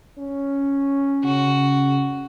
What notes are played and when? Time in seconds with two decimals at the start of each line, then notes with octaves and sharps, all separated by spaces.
0.18 C#4
1.24 C#3 F#4